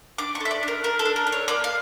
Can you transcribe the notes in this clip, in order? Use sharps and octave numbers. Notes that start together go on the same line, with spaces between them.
D4 D6
C#6
A4
E5
D5
D4
A#4
D4 A#4
A4
D4
A#4
D4
C#5
A#3 D5
F5